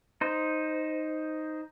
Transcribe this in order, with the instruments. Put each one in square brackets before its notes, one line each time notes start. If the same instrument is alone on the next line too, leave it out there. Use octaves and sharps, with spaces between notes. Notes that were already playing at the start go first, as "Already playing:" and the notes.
[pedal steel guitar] D#4 C5